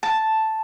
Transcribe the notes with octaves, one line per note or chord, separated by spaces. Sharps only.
A5